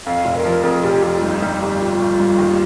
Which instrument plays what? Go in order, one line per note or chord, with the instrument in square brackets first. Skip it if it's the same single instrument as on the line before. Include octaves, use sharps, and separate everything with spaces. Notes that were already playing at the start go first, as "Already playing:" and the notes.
[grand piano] F2 [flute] F5
[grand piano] F1
[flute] A#4
[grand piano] F3
[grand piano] F2 [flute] G#4
[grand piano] F1 [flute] G4
[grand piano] F2 [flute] F4
[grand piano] G2 [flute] D#4
[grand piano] G3 [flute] D#4
[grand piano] G1 [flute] G4
[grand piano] G1 [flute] F4
[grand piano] G1
G2
D#2